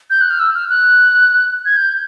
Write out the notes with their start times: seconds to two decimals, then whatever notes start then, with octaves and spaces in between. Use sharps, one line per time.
0.10 G6
0.21 F#6
0.30 F6
0.40 E6
0.55 F6
0.69 F#6
1.65 G#6
1.77 G6